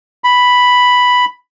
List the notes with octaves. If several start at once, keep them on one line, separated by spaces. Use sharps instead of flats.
B5